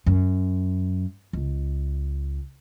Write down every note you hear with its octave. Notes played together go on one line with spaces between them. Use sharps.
F#2
C#2